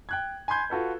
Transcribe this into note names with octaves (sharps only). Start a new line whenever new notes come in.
G5 F#6 G#6
G#5 B5 C6 G6 G#6
F4 F#4 A4 B4